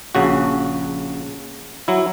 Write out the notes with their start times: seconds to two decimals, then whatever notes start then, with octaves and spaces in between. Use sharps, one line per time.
0.15 A#1 C#3 F#4
1.88 F#3 E4